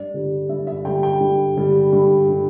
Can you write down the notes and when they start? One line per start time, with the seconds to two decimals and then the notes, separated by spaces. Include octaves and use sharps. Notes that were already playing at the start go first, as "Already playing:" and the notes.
Already playing: G2 D5
0.14 D3 G3
0.49 G2 E5
0.67 E5
0.85 D3 G3 G5
1.03 G5
1.20 G2
1.57 D3 G3
1.93 G2
2.29 D3 G3